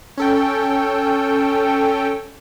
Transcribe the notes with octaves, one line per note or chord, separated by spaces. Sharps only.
C#4 A4 G5